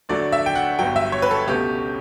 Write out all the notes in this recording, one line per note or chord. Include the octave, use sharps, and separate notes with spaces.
D2 D3 F#3 A3 D5
E5
G5
F#5
G1 G2 F#3 G5
E5
C#5
B4
A4
C#2 B2 A3 C#4 G4